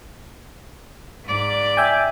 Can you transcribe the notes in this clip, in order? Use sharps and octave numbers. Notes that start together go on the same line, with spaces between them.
G#2 D5
E5 G5 G#5